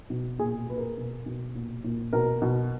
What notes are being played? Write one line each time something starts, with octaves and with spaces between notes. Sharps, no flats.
B2
A#2 G#4
A#2 B4
A#4
B2
B2
A#2
A#2
B2 A#4
B2